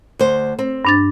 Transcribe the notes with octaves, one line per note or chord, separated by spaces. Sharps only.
D2 C5
C4
G2 D4 A6